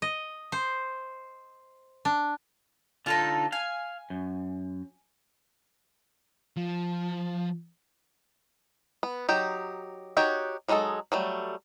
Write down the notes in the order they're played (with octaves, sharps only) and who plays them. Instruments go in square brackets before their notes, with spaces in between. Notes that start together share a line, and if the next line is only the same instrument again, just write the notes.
[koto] D#5
C5
D4
[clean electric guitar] D3 F4 [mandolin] D#4 A4 A5
[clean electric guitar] F5 [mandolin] G#5
[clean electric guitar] F#2
[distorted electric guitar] F3
[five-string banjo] B3
F#3 D#4 G4
D#4 F#4 G4 C#5
F#3 G#3 D#4 F4 A4
F#3 G3 A3